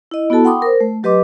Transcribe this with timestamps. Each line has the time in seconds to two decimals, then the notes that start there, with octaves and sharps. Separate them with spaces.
0.11 E4 D#5
0.30 B3 E4 F#4 A4 A5
0.44 F#5 G5 B5 C6 D6 D#6
0.62 A#4 C5
0.80 A3
1.03 F#3 G4 B4 D#5 C6 D6